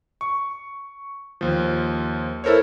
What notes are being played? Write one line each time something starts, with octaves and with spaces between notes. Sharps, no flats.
C#6
D#2 F3
E4 A4 A#4 C5 C#5